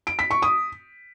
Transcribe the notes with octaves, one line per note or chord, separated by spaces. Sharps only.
D7
B6
C#6
D#6